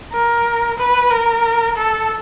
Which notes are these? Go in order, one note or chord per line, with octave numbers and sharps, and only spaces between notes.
A#4
B4
A#4
A4